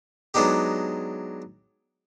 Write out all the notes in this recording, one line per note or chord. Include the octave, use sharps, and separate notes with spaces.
F#3 G#3 B3 D4 D#4 G4